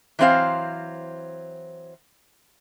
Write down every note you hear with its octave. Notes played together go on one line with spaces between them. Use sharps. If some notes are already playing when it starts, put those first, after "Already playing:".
E3 F#3 C4 C5 F5